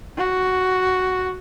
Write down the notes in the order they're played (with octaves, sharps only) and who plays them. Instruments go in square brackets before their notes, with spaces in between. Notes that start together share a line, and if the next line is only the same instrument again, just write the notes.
[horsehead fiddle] F#4